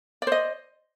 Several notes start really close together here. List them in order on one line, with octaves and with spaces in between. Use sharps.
D5 C5 D#5